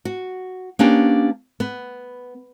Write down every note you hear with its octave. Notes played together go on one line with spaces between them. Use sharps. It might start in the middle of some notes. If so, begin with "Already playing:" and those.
F#4
A#3 B3 C#4 D4 G4
B3